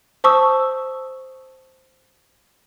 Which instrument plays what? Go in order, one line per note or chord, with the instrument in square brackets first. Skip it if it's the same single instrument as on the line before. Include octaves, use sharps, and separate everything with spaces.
[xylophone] C5 A5 C#6 D#6 E6